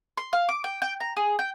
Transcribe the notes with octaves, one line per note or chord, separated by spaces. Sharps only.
C6
F5
D6
G5
G5
A#5
G#4
G5